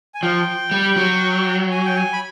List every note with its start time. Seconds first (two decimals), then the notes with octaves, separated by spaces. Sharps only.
0.14 G#5
0.23 F3 G5
0.71 G3
0.97 F#3
1.71 G#5
1.85 G5
1.96 G#5
2.13 B5